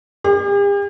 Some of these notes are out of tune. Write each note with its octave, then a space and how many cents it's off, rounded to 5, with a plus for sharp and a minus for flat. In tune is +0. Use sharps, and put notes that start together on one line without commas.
G4 +45